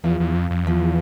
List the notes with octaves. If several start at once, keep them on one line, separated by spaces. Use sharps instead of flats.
E2 F3
E2
F2
F2
E2 F3